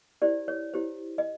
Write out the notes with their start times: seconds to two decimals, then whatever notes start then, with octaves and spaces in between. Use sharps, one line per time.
0.22 E4 G4 C5 D5
0.48 C#5
0.74 E4 G4 C5
1.18 D#5